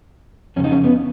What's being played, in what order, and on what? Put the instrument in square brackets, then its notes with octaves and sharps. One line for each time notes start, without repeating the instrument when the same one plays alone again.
[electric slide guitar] F2 C#3 C#4
D#4
C#4
B3